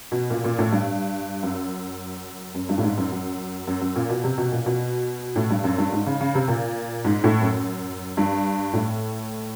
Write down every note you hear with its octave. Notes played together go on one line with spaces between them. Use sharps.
B2
A#2
A#2
A2
G2
F#2
F#2
G2
A2
G#2
F#2
F#2
F#2
F#2
A#2
B2
C3
B2
A#2
B2
A2
G2
F#2
G2
G#2
C#3
C#3
C3
A#2
G#2
A2
F#2
G2
A2